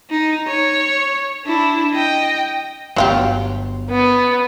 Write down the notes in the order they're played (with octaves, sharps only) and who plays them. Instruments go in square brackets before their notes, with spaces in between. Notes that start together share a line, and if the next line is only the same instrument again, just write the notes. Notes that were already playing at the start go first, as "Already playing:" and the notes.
[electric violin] D#4
C#5
D4 E4
D#5 G5
[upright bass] G1 B3 [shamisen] F#3 F4 G4
[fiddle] B3